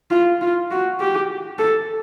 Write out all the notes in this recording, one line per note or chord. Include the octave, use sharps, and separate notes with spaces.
F4
F4
F#4
G4
A4